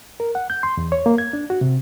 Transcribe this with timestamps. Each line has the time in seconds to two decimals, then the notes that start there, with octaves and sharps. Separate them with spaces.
0.20 A#4
0.35 F#5
0.50 G6
0.63 C6
0.77 E2
0.92 C#5
1.06 A#3
1.18 G#6
1.33 D4
1.50 F#4
1.61 C3